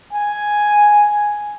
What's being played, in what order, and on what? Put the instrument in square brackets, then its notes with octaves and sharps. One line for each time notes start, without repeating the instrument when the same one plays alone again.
[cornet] G#5